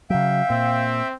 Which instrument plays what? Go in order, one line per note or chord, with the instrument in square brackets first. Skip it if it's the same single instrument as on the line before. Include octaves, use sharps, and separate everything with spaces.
[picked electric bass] C#3 F#3 [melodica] E5 G5 [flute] F5
[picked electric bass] A#2 [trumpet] C4